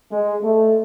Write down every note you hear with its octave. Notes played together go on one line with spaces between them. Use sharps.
G#3
A3